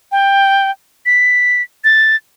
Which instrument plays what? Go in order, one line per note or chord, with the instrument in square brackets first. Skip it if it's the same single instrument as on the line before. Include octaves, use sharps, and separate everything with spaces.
[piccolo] G5
B6
A6